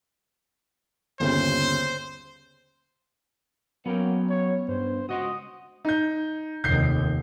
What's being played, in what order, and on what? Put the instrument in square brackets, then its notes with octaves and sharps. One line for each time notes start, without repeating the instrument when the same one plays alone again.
[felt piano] G1 D#2 C#3 [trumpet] C5
[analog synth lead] F#3 [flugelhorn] A#3 [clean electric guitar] B3 C#4 G5
[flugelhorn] C#5
[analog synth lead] G2 [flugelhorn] C5
[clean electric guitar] C#2 D#5 C6 [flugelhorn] F#4 [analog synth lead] D#6
[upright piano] D#4 G6
[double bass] F1 D#2 [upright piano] G6 C7